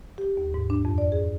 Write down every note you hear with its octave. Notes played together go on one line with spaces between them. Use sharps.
G4
D#2
G#2
D4
F2
D5
G#4